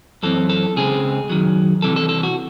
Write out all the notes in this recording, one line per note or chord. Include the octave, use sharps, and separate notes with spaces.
F#2 E3 C4 A4
A4
C#2 C#3 G#3 C4 G#4
F#2 D#3 F#3
C2 C3 E3 A4
A4
A4
F#4